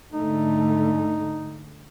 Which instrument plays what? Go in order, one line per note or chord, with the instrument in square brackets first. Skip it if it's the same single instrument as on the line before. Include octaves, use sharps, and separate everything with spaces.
[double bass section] G#2 D3 A3 [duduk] D#4